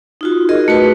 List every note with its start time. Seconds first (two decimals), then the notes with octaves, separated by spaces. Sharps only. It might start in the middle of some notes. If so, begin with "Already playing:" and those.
0.21 D#4 F4 F#4
0.49 F#4 G#4 A#4 D#5
0.68 A3 F#4 B4